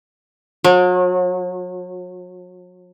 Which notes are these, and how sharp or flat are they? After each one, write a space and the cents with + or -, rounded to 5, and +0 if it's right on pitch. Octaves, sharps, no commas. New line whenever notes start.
F#3 -40